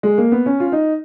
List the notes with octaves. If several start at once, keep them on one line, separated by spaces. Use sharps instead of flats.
G#3
A#3
B3
C#4
F4
D#4